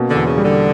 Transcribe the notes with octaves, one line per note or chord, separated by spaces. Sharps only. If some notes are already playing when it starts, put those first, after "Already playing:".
Already playing: B2 A#3 C#4
D3
E2
C#3
G3
D3